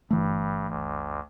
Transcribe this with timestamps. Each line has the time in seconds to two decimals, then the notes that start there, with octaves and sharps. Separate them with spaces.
0.11 G1 G2 E3 A3
0.68 D2